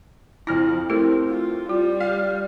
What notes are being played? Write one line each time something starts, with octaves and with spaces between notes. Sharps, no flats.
F2 E4 F6 A#6
A3 C4 E4 G4 A#4
F4
G3 F4
F5